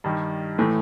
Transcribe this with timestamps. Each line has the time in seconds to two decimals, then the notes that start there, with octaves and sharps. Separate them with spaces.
0.04 G2 D#3 G3
0.58 A2 E3 A3